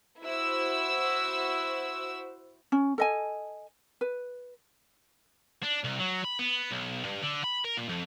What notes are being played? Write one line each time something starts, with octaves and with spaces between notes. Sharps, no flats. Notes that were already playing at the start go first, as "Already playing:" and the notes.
E4 F#4 C5 E6
C#4
A4 D#5 G#5
B4
D4
C2
F#3
B5
B3
B1
G2
D3
B5
A#4
A#2
F2